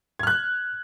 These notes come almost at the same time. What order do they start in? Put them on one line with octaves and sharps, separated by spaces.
G#6 F6 F#6